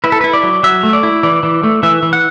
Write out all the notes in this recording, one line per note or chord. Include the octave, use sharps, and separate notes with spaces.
E4 B4
A4
E4 B4
D5
F#3
F#3 E5
A3
D5
E4
E3 D5
E3
A3
E3 E5
E3
F#5